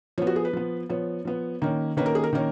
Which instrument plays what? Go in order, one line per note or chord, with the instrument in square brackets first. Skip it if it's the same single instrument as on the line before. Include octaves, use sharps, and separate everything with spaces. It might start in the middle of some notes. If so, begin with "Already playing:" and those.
[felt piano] F3 C#5
B3
F#4
G#4
B4
F3 B3
F3 B3 C#5
F3 B3
D#3 A#3 C#4
D#3 A#3 C#4 B4
A#4
G#4
A#4
D#3 A#3 C#4